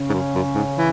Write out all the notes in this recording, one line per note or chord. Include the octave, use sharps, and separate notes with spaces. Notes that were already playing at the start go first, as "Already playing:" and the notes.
Already playing: C#3 C#4
G#2
F#2
F#2
G#2
E3